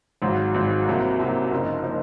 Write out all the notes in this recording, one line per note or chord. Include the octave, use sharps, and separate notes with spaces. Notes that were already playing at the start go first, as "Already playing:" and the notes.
G#1 G#2 F#3
G#1 G#2 F#3
C2 C3 F#3 A#3
C2 C3 F#3 A#3
F#1 F#2 F3 A#3 D#4
F3 A#3 D#4